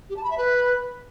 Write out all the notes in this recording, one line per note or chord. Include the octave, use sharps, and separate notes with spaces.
G4
A5
B5
E5
B4